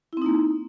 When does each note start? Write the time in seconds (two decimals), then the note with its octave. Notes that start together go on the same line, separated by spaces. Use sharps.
0.13 E4
0.17 C4
0.22 D#4
0.26 A#3